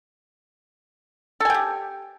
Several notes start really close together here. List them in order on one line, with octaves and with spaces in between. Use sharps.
A4 G#5 G5 G4